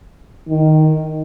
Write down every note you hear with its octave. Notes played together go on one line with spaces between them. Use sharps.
D#3